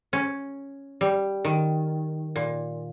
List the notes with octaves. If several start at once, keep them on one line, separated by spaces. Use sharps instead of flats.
C#4
G3
D#3
A#2